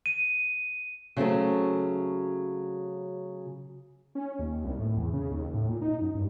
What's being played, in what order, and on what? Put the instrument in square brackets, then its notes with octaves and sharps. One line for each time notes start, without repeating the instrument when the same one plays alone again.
[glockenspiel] D#7
[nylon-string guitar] C#3 F#3 A3 C4
[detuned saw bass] C#4
D#2
C2
A2
E2
C#3
D#2
A2
A#2
D#4
F#2
G2